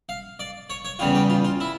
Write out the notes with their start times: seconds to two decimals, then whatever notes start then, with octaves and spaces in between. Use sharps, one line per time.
0.09 F5
0.39 D5
0.70 C#5
0.85 C#5
0.99 E2 C#3 G3 F4
1.15 G4
1.30 F4
1.44 F4
1.60 E4